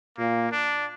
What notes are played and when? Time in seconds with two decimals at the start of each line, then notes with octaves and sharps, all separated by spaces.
0.18 A#2 A#3
0.51 D4